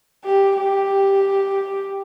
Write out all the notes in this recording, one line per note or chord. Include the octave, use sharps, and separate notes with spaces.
G4
G4